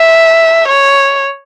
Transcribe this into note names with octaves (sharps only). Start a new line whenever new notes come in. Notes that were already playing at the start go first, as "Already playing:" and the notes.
Already playing: E5
C#5